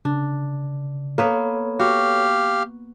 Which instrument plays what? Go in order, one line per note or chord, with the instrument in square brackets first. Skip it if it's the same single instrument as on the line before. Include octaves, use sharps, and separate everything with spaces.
[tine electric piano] C#3 [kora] D4
[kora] A#3 B3 B4 [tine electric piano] A4 C#5
[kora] F#4 [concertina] G4 F5